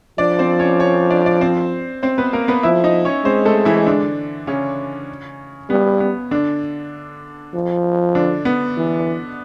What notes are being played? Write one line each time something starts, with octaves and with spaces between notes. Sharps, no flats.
F3 D4 D5
C4 C5
C#4 C#5
C#4 C#5
D4 D5
D4 D5
C4 C5
C4 C5
B3 B4
A#3 A#4
B3 B4
F3 E4 E5
D#4 D#5
C#4 C#5
G#3 C4 C5
A3 A4
E3 E4
D3 D4
C#3 C#4
G3 B3
B3
D3 D4
F3
D3 D4
B3
E3